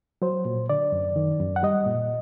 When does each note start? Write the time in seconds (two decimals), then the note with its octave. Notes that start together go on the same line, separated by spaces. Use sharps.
0.22 F#3 C5
0.45 A#2
0.69 D3 D5
0.92 F#2
1.16 D#3
1.40 F#2
1.56 F#5
1.63 G3 D#5
1.86 A#2